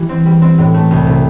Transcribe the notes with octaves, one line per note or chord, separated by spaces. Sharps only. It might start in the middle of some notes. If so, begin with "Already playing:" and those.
Already playing: E3 G3 E4
C4
G3
C4
A2
A3
C2
C3